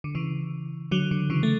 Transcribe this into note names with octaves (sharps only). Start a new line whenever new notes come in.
D3
C#3 E3
D3 F#3
D3
C#3 E3
A3